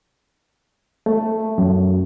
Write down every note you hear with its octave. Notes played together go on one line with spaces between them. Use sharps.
A3
F#2